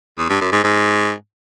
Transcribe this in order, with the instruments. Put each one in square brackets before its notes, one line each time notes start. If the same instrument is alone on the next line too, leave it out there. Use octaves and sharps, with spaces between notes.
[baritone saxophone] E2
G2
F#2
G#2
G#2